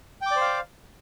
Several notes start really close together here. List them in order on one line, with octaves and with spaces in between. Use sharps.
G5 D6 D5 C5 F5